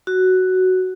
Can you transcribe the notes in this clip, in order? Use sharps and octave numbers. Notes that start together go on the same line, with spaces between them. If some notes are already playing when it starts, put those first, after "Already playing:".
F#4